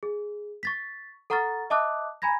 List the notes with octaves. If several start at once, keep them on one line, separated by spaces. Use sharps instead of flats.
G#4
C#6 A6 B6
A4 F#5 A#5 C#6 F6 A6
D#5 E5 A5 D6 D#6 F#6
G#5 A#5 B5 G#6 A#6